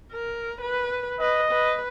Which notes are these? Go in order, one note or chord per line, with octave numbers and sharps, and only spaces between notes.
A#4
B4
B4 D#5
B4